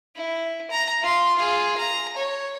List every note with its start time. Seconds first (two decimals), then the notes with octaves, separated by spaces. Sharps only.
0.15 E4
0.71 A#5
1.02 F4 C6
1.36 F4 G#4
1.78 A#5
2.17 C#5